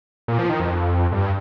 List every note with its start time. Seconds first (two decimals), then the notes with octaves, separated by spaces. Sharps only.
0.28 A#2
0.39 F3
0.49 D#3
0.60 F2
1.12 G2